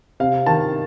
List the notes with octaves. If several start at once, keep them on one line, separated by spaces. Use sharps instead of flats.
C3 F5
D#3 A5